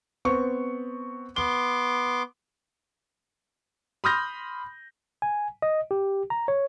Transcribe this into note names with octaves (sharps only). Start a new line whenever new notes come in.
B3 C4 C#6
B3 C6 D6 G7
B5 C6 D#6 F6 G6 A#6
G#5
D#5
G4
A#5
C#5